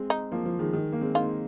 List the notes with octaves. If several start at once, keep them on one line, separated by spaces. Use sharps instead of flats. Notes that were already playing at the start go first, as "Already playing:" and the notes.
Already playing: G#3 C4
D#4
F3 A#3
F3
D#3 G#3
D#3 G#3
A#3
G#3 C4
A#3 D#4 F4